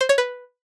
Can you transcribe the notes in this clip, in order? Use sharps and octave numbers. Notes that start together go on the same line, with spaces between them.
C5
C#5
B4